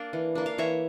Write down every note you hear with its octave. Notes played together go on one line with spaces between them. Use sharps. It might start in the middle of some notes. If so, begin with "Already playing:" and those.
Already playing: A#3 D4 D5 F5
E3
A#3 D4
F5
E3 C#5 E5